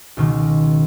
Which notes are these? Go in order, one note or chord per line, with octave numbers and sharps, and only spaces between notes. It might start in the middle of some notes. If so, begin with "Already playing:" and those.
C#2 B2 D#3